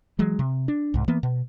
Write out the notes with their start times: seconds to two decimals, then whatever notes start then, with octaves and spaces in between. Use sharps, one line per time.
0.19 E3 F#3 G#3
0.39 C3
0.68 D4
0.94 C2 G#2
1.08 E3 A#3 B3
1.23 B2